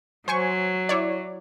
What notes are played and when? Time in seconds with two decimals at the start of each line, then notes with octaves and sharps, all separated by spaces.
0.28 F#3 C5 G#5 C#6
0.89 E4 C#5 D5